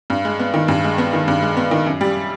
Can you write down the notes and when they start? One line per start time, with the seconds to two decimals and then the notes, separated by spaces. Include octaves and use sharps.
0.10 G2
0.25 G#3
0.39 B3
0.54 D#3
0.68 G2
0.84 G#3
0.98 B3
1.13 D#3
1.28 G2
1.42 G#3
1.57 B3
1.71 D#3
1.86 F#2
2.01 G3